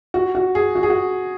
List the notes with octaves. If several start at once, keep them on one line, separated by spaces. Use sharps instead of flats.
F#4
F#4
G#4
F#4
G#4
F#4